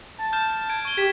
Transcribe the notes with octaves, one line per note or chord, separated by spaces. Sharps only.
A5
F6 G6 E7
G#6 D7
C#6 G7
G4 G#6 B6 E7